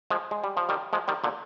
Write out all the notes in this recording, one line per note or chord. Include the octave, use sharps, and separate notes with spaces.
F3 G#3
G#3
G3
F3
D#3 G3
F3 G#3
D#3 G3
A#2 D3